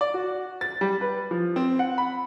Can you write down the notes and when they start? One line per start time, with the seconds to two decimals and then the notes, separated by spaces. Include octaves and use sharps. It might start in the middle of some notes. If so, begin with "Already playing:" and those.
0.01 D5
0.14 F#4
0.61 A6
0.81 G3
1.01 B4
1.31 F3
1.56 C4
1.79 F#5
1.98 B5